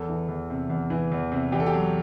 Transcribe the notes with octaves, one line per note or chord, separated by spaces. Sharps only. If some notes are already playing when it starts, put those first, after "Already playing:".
Already playing: E2 A4
E3
E2
C3
E2
E3
E2
C3
E2 G4
A4
G4
F#3